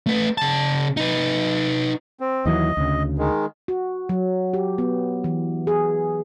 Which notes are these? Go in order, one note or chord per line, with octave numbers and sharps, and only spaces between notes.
A3 B4
C#3 A5
D#4 B4
C4
D#2 E3 F#3 D#5
D2 C#3
D#3 G#3
F#4
F#3
G4
B3
E3
G#4